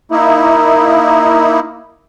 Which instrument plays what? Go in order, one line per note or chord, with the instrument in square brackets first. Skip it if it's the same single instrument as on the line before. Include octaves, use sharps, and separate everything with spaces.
[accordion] A#3 D#4 E4